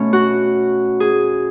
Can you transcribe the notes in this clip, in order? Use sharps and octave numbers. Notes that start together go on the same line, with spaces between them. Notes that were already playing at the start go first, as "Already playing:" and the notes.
Already playing: B2 A3 C#4
F#4
G#4